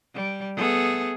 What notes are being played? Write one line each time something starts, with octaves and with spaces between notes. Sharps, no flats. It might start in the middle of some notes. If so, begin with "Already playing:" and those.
G3
A3 B3 G#4